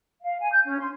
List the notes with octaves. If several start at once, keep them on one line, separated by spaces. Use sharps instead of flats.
F5
G#5
G6
C#4
C6